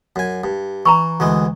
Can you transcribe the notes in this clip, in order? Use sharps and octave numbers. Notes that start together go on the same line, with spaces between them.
F#2 G#5
G2
E3 A#5 B5 C#6
D2 E3 G#3